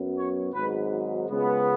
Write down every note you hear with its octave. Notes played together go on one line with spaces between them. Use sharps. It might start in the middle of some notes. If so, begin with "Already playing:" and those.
Already playing: F#2 F#3 B3
C#5
G#1 G#2 F#3 B4
C#2 C#3 G#3 B3